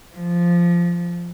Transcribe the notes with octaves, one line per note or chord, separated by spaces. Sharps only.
F3